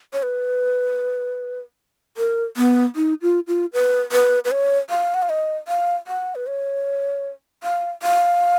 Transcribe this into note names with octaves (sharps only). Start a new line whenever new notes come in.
C#5
B4
A#4
B3
D#4
F4
F4
B4
B4
B4
C#5
F5
F#5
F5
D#5
F5
F#5
B4
C#5
F5
F5